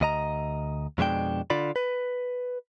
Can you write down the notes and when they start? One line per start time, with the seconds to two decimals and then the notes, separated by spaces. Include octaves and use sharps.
0.01 D2 D#5 A#5
0.98 F2 B2 G#3 D4 G5
1.50 D3 F4 D5 B5
1.76 B4